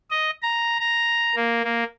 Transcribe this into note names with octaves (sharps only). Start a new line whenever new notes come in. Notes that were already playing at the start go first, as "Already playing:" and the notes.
D#5
A#5
A#5
A#3
A#3